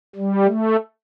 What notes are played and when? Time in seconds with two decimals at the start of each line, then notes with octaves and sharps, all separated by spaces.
0.16 G3
0.45 A3